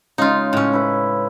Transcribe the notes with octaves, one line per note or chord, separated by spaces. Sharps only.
C#3 G#3 D#4 F4
A2 C#4
E4 B4